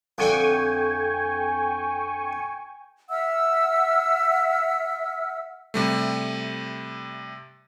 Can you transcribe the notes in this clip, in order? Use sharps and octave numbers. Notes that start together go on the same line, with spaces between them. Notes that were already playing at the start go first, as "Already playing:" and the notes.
F2 D3 G5 G#5 C#6
E5 F#5 E6 F6
C3 G3 A3